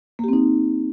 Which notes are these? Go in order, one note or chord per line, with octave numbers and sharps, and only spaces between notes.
A#3 C4 D#4 G4